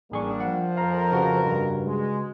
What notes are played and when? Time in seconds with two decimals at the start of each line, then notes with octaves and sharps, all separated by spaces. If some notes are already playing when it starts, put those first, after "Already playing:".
0.12 A1 G3 A#3 D4 G#4 C#6
0.40 F3 F#5
0.77 F2 A#4 F5 A#5
1.12 C#3 F#4 B4
1.45 G2
1.86 G#3